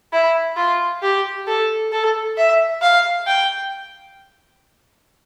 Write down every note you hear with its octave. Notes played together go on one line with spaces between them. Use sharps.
E4
F4
G4
A4
A4
E5
F5
G5